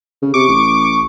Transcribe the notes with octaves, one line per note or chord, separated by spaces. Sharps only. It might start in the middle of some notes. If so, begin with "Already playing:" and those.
C#3
C3 C#6 D6
A1